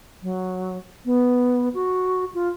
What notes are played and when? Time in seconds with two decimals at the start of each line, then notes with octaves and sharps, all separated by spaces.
0.23 F#3
1.06 B3
1.74 F#4
2.34 F4